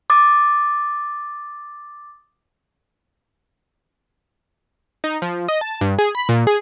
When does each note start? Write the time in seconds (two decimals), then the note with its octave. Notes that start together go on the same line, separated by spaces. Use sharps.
0.10 D6 D#6 A6
5.04 D#4
5.22 F3
5.48 D#5
5.61 A5
5.81 G2
5.99 G#4
6.15 B5
6.29 A#2
6.47 G#4